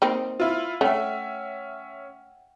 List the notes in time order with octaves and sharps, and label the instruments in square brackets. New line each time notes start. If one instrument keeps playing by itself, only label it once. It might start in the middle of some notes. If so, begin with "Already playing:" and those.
[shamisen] A#3 C4 D#4
[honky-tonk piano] E4 F4
[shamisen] A3 [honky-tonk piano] C#4 E5 [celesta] F#5 G5